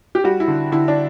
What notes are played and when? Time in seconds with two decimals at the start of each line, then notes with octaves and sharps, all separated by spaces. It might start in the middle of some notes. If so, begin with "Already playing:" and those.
0.15 G4
0.24 G3 F#4
0.40 E4
0.48 D3
0.72 D3 E4
0.88 D4